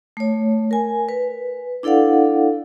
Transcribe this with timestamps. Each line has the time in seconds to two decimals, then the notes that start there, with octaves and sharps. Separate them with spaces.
0.17 A3 C#5
0.71 A#4 G#5
1.09 B4
1.83 D4 E4 A4 D5 F5 F#5